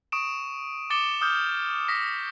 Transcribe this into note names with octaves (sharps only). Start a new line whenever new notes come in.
C#6 D#6 D7 E7
D6 A6 C#7 E7 G7
D6 D#6 F6 G6
D#6 A#6 B6